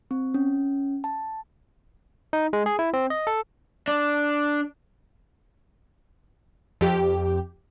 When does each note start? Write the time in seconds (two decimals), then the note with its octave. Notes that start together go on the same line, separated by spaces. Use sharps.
0.11 C4
0.34 C#4
1.04 A5
2.33 D#4
2.53 G#3
2.66 G#4
2.79 E4
2.93 C4
3.10 D#5
3.27 A4
3.88 D4
6.81 F2 G4